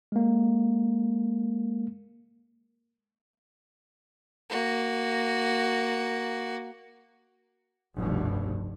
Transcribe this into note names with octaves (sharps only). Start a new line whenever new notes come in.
G#3 A#3
A#3 F#4
F1 C2 G2 B2